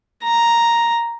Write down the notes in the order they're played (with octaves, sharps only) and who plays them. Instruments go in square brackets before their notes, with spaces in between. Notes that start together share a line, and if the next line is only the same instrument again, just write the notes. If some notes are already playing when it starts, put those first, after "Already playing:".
[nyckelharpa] A#5